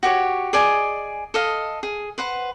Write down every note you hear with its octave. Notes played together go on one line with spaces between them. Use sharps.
F#4 G4 C#5
G#4 D5 D#5 G#5
A4 D#5 F5
G#4
B4 C5 F#5